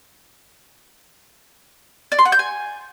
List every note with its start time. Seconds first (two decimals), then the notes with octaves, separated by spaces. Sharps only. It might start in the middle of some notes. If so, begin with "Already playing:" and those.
2.12 D5
2.19 C6
2.25 F#5
2.32 G6
2.39 G#5